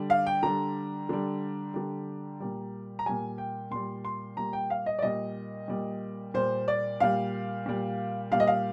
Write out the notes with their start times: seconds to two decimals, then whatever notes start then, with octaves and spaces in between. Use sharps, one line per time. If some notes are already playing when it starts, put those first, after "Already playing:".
Already playing: D3 G3
0.10 F5
0.27 G5
0.43 D3 G3 A#5
1.09 D3 G3
1.74 D3 G3
2.40 A#2 G3
2.99 A#5
3.06 A#2 G3 G#5
3.38 G5
3.71 A#2 G3 C6
4.05 C6
4.37 A#2 G3 A#5
4.53 G5
4.70 F5
4.86 D#5
4.99 D5
5.02 A#2 G3 D#5
5.68 A#2 G3
6.34 A#2 G3 C5
6.68 D5
7.00 A#2 G3 F5
7.66 A#2 G3
8.31 A#2 G3 F5
8.40 D#5
8.47 F5